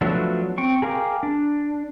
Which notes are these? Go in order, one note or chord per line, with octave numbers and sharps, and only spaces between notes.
F3 F#3 A3 B3 D4
C4 G5 C#6
G#4 A#4 F5 G5 D6
D4